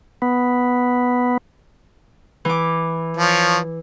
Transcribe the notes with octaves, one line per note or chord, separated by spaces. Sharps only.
B3
E3 D6
F3 C#5